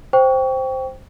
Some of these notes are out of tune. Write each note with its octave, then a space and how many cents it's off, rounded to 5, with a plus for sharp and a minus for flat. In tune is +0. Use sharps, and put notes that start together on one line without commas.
C5 +0 G5 +0 C#6 +30